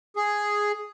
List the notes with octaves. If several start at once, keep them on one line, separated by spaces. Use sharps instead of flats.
G#4